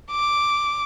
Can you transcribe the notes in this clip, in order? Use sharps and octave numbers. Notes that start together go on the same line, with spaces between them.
D6